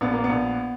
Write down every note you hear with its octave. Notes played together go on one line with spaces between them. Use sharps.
A#1 B3
A#3
B3
A#1